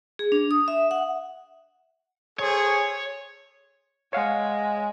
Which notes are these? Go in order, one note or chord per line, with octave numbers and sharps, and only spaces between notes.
G#4
D4
D#6
E5
F#5
G#4 A4 C5 C#5
G#3 C#5 F5 F#5